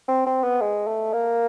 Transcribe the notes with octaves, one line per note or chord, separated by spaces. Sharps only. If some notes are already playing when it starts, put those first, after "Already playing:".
C4
C4
B3
G#3
A3
A#3